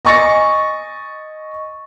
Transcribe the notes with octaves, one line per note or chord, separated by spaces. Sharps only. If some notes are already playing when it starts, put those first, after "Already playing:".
D#5 G#5 C#6 A6 A#6 C#7